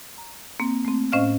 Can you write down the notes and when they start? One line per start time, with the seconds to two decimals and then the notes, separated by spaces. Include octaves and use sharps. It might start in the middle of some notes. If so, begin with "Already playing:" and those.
0.18 A#5
0.60 A#3 C4
0.85 A3 C4
1.12 A2 C#4 C5 D#5 F5 F6